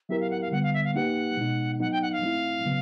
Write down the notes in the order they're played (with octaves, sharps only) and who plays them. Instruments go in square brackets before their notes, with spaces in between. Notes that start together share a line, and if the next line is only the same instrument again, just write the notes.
[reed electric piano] F#3 B3 E4 G4 A#4 [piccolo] E5
[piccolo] F5
F#5
F5
[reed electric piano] D3 G3 B3 [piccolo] F#5
[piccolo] F5
E5
F5
[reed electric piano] A#3 D#4 G4 B4 [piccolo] F#5
[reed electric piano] B2 G#3 B3 D#4
[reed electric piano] F#3 B3 D#4 [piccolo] F#5
[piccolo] G5
F#5
F5
[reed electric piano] A3 C4 E4
C#3 F#3 B3